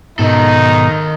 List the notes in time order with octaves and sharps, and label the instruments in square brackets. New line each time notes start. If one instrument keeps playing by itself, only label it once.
[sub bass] G#2 [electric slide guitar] B2 [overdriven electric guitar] D#3 A4 [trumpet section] D#4